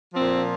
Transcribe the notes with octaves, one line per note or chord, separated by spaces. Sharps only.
A#2 F3 C4